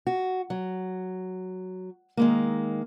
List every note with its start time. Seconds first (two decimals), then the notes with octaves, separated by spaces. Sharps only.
0.07 F#4
0.50 F#3
2.17 D#3 G#3 A#3